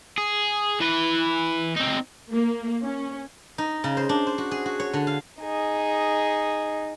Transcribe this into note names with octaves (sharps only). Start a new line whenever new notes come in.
G#4
E3 B4
C4 D#4
A#3
C#4
D#4
C#3
C5
D4
C5
F#4
G#4
F#4
C#5
D3
F5
D#4 G#4